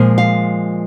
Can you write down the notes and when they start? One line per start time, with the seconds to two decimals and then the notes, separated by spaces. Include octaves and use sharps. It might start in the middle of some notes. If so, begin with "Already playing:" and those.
Already playing: A#2 F3 G#3
0.18 F5